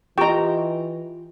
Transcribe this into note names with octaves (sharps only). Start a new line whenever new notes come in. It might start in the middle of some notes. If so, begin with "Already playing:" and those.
E3 F4 G4 D#5 G5 A#5 C#6